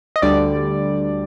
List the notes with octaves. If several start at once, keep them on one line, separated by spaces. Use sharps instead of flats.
D#5
D2 D3 G3 D5